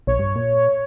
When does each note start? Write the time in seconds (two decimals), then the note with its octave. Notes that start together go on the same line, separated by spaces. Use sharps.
0.07 A#1 C#5
0.19 G2
0.36 A#2